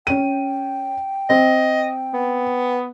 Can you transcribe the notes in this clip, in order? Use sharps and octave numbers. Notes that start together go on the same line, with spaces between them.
C#4 G5 D#7
C4 D#5
B3